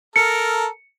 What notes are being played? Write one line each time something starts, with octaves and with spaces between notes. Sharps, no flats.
A4 A#4 C#7